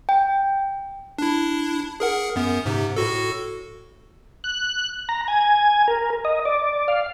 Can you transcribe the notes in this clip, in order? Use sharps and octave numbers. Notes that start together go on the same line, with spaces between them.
G5
D4 E4
G#4 A#4 F#5
F#2 B3
G#2 C3
A2 F#4 A4
F#6
A#5
G#5
A#4
D#5
D5
F5